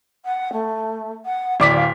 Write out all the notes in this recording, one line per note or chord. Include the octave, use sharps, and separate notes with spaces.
F#5
A3
F#5
D1 D5 D6 B6
F5